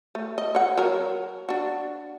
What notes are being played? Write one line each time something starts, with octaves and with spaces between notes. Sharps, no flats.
A3
D#5
C#5 F#5
F#3 A#4
D4 F#4